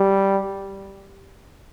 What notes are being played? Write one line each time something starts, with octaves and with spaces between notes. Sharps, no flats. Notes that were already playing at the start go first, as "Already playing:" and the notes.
Already playing: G3